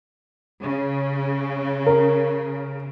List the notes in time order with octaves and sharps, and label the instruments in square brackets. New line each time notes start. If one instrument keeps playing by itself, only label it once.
[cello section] C#3
[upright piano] A#4